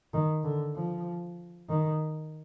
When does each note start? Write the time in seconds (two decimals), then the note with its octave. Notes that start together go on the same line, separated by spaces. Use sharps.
0.14 D#3
0.44 D3
0.75 F3
1.69 D#3